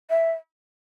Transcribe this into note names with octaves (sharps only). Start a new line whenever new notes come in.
E5